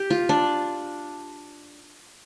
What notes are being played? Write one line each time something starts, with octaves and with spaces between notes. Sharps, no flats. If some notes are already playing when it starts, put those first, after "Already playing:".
Already playing: G4
F4
D4